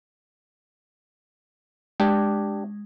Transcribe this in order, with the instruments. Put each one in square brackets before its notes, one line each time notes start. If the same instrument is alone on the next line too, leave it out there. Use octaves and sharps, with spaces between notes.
[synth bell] G#3 [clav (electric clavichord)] D4 G4